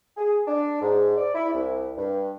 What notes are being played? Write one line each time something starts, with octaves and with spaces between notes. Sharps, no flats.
G#4
D4
G#2
D5
E4
C2
G2